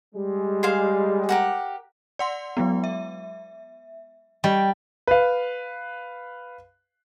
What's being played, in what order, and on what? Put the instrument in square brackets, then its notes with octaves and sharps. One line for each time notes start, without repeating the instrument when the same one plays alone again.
[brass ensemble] G3 G#3
[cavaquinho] G#4 C5 F5
G4 A#4 F#5
[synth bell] D5 F#5 C6
F#3 G#3 B3
E5
[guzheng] G3 [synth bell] D#5
[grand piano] B4 F5